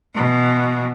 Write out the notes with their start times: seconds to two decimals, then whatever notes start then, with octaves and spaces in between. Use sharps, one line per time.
0.15 B2 E3